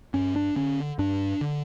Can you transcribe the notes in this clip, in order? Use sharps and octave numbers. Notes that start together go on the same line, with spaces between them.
G2 C#4
D4
D3 C#4
G2 D4
D3